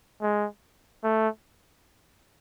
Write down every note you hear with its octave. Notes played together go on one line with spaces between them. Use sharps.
G#3
A3